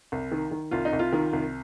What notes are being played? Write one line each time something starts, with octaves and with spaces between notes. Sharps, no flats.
C2
D#3
D#3
C2 F4
D#4
C2
F4
D#3
C2